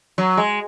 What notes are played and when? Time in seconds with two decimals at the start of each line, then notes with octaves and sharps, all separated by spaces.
0.18 F#3
0.37 G#3